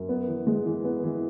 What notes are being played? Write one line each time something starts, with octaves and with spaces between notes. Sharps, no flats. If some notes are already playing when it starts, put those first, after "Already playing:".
Already playing: F#2
B3
E3
G#3
E3
B3
E3